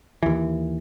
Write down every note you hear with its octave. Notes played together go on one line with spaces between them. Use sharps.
D#2 E3